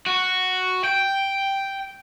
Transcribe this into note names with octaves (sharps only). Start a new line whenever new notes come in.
F#4
G5